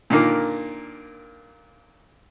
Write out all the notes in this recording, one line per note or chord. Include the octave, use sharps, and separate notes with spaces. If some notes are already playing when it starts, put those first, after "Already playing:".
A#2 D3 D#3 A#3